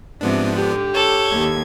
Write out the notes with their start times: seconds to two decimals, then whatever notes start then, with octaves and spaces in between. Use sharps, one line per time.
0.21 G#2 C3 F3 B3 D4
0.56 D3 G4
0.95 A4 C#5
1.27 D#2 G#6